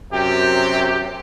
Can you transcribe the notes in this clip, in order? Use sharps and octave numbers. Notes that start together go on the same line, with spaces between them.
F#2 C3 G4